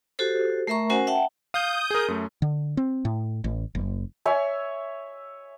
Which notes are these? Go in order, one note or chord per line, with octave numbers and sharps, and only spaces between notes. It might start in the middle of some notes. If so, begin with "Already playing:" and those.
F#4 G4 A4 C5
A3 A#4 E5 A#5 C#6
C#4 F#4 A#4 C5 F#5 G#5
E5 F#5 G5 A5
F5 D#6 G6
G#4 A#4
F#2 A3
D3
C4
A2
A1
F#1
C#5 E5 G#5